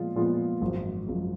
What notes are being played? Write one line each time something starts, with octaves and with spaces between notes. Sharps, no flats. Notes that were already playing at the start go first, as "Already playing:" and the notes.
Already playing: A#2 F3 G#3 B3 F4
A#2 F3 G#3 B3 F4
G#1 F#2 F3 G#3
G#1 F#2 F3 G#3